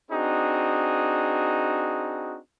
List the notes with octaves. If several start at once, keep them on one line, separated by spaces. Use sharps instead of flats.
C4 D4 D#4 F#4 G#4